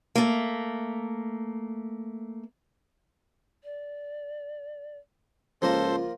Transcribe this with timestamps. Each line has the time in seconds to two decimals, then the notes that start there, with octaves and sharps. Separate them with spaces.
0.16 A3 A#3
3.64 D5
5.62 C#2 F3 A#3 F4 A4 A#4 C5 C6